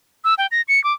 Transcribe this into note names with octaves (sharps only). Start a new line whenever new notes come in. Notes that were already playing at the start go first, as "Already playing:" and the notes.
E6
G5
A#6
C#7
D6